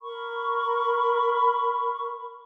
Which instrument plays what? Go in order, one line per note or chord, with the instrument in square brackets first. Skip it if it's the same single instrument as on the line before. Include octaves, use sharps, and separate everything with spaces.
[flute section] A#4 B5 C#6